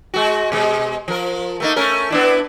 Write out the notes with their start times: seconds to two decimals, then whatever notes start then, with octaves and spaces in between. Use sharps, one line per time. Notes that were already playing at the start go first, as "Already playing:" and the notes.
0.14 G#3 F#4
0.52 B2 G#3
1.08 F3 A#4
1.60 A3 A#3 D#4
1.76 A3 C#4 A#4
2.10 B3 D4 E4